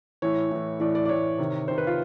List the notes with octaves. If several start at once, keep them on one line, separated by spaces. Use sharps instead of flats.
A2 E3 C#5
A2 E3
A2 E3 D5
D5
D5
A2 E3 C#5
C3 D#3
C3 D#3 C5
B4
F4